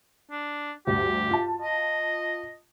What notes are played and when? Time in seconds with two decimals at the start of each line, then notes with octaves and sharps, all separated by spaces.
0.31 D4
0.87 D2 G2 G4
1.31 F4 A5
1.62 D#5